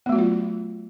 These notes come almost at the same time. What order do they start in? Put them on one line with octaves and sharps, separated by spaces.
B3 A3 F#4 F#3 F4